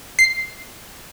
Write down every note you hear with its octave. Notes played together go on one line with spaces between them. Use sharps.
C7